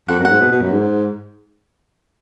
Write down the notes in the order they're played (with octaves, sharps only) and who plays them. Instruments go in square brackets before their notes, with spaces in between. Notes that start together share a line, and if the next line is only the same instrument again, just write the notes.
[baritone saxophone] F2 [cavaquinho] F#5
[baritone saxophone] F#2
[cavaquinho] F#5
[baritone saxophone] G#2
B2
B2
F#2
G#2